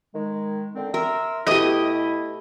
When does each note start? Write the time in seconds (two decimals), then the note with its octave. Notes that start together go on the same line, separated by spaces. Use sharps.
0.15 D#3 G#3
0.75 D3 D#3 C4
0.94 A#4 E5 C6 E6
1.47 B2 A3 E4 G4 D#5 D#6